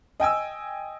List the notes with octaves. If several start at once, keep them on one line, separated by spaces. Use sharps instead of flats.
D#5 G5 G#5 E6